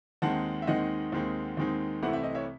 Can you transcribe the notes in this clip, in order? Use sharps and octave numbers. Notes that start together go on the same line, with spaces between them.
D#2 D#3 G#3 C4 D#4 F#5 A5
E5
D#2 D#3 G#3 C4 D#4 D#5 F#5
D#2 D#3 G#3 C4 D#4
D#2 D#3 G#3 C4 D#4
C2 C3 E3 A3 C4 F#5
E5
D#5
C#5 E5